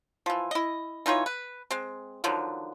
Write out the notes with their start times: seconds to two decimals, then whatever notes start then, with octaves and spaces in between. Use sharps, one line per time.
0.26 E3 F3
0.51 E4 D#5
1.06 E3 D#4 F4 C#5
1.26 B4
1.71 G#3 C4
2.24 D3 D#3 F3 F#3